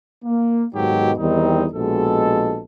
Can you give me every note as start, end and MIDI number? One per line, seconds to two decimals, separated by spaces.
0.25 0.65 58
0.75 1.12 44
0.75 1.12 47
0.75 1.12 51
0.75 1.12 54
0.75 1.12 67
1.18 1.67 40
1.18 1.67 51
1.18 1.67 55
1.18 1.67 60
1.18 1.67 63
1.74 2.62 34
1.74 2.62 47
1.74 2.62 56
1.74 2.62 69